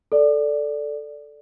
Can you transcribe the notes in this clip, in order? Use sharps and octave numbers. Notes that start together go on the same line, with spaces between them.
A4 D5